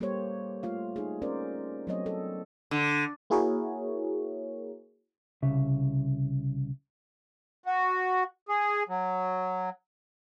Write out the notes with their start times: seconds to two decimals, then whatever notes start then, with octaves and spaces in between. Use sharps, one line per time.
0.01 G3 A#3 G4 A4 C5 C#5
0.63 A3 F4 F5
0.96 D#4 G#4
1.22 A#3 C4 C#4 A#4 C5 D5
1.87 F#3 A3 B3 C4 C#5 D#5
2.06 A4
2.71 D3
3.30 A#3 E4 F#4 G#4 A#4 C#5
5.42 C2 C#3 E5
7.66 F#4
8.49 G#4
8.89 F#3